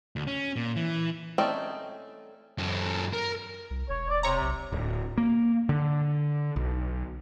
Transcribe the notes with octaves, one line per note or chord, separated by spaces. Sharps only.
D2
C#4
A#2
E3
A3 C4 C#4 D#4 D5
F#2 A4
A#4
C2
E1 C#5
D5
C3 C#5 A#5
B1
D1
A#3
D3
B1